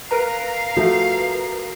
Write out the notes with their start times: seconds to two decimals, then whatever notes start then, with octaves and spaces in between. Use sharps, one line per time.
0.11 A#4 B4 F5 A#5
0.77 F3 A3 F#4 E5